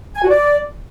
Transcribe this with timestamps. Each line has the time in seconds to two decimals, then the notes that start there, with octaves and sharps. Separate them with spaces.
0.16 G#5
0.23 F#4
0.30 D5